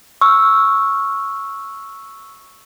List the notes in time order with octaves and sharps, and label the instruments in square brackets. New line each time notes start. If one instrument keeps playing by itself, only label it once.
[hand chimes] C#6 E6 F6